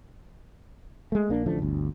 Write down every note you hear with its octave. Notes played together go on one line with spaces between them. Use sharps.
G#3 A3
A#1 A#3 D4
A1 D3 F3 A3
G1 D2